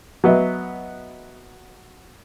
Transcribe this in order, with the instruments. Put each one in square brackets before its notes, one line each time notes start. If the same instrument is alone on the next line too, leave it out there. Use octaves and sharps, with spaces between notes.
[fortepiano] F#3 B3 D#5 E5